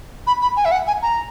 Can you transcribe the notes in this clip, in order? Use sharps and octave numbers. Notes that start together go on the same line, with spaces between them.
B5
B5
G#5
E5
F#5
G#5
A#5